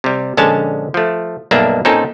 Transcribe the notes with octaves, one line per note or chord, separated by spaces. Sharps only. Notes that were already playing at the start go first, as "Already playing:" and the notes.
C3 G3
A#1 D3 G#3 C#4 A5
F3 A3
B1 G2 A#3 D4 E5
A#2 C4 C#4 D#4 A4